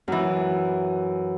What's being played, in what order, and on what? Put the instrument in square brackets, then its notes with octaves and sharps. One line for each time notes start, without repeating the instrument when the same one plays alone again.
[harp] F#2 E3